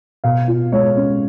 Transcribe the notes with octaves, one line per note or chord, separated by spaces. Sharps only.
B2 F5
F4
G#3 C#5
C#4